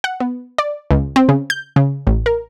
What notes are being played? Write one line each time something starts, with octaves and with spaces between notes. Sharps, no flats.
F#5
B3
D5
C#2
C4
C#3
G6
C#3
A1
A#4